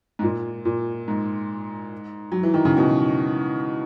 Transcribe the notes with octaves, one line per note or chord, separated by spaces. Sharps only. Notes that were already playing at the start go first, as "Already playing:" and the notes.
G#2
A#2
A#2
G#2
F#3
E3
D#3
C#3
B2